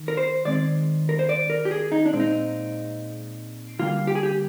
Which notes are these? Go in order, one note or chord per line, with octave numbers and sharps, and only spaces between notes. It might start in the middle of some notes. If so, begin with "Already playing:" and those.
Already playing: D#3
A#4
C5
D#3 G#3 C4 D5
A#4
C5
D5
A#4
G4
G#4
D#4
D4
A#2 G#3 C4
D#4
D3 G3 A#3 F4
G4
G#4
G4